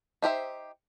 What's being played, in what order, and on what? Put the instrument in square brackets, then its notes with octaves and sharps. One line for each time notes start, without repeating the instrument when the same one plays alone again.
[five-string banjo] D#4 G4 C5 E5